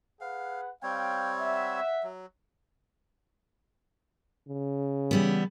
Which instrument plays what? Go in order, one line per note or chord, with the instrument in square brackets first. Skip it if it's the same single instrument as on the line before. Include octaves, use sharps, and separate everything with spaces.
[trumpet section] G#4 B4 F#5 [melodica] F5
[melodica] G3 C4 C#5 [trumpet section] F5 G5
[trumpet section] E5 F#5
[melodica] F#3
[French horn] C#3
[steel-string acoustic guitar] E3 G3 B3